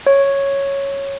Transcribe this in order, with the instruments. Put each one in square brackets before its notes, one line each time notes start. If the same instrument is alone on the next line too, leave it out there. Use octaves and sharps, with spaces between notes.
[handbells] C#5